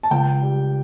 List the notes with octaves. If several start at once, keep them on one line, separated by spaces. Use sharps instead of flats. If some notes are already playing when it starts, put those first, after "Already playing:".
A5
C#2 G5
G3